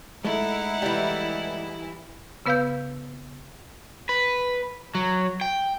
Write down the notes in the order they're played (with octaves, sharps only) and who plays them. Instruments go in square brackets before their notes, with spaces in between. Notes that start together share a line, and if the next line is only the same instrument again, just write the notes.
[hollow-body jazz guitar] G#3 A3 A4 [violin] D#4 F#5 [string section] E4
[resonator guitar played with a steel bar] E3 G3
[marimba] C#3 B3 B4 F5 E6 G6
[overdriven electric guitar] B4
F#3
G5